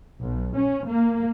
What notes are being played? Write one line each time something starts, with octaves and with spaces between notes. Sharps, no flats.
B1
C#4
A#3